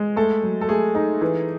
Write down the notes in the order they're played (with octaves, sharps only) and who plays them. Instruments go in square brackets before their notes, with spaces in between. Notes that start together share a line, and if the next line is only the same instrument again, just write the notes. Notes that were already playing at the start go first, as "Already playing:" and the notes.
Already playing: [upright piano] G#3
[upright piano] A3 [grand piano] A4
[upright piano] F#3
[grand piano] A4
[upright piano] A3 [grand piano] G#4
[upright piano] D#4
E3